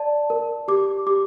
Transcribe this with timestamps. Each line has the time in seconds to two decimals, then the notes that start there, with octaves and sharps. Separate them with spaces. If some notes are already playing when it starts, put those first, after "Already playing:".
Already playing: D5 A5
0.30 A#4
0.68 G4 D6
1.07 G4 D6